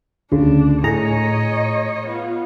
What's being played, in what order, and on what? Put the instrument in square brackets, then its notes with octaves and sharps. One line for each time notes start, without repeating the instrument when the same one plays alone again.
[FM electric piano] D2 C#3 [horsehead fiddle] D4
[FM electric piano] A2 G#4 A#5 [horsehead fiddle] C#5 D#5
[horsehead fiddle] B3 F4